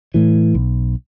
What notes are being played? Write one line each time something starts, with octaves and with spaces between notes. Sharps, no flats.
A2 E3
B1